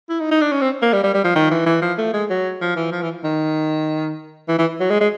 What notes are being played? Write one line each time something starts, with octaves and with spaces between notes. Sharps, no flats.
E4
D#4
D#4
D4
C#4
C4
A#3
G3
G3
G3
F3
D#3
E3
E3
F3
A3
G#3
F#3
F3
E3
F3
E3
D#3
E3
E3
F#3
G#3
G#3